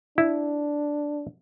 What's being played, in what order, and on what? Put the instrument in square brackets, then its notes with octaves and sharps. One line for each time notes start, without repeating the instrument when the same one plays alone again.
[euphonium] D4 [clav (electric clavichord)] E4